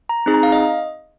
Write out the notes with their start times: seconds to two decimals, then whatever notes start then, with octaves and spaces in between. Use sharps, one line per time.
0.09 A#5
0.26 C4 D#4 G#4
0.34 A#5
0.43 F5
0.52 D#5